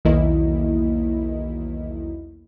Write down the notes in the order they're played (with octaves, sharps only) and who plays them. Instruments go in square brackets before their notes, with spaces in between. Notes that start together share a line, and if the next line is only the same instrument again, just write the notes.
[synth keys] B1 E2 D#3 A#3 E4 D#5